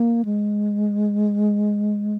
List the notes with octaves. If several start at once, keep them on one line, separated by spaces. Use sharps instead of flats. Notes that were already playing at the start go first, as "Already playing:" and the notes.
Already playing: A#3
G#3